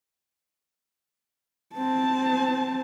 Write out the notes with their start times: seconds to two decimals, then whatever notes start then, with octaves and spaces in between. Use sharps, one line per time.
1.75 C4 A5